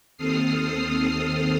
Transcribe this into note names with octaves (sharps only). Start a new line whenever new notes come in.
D#2 C4 A4 D#6 F6 C7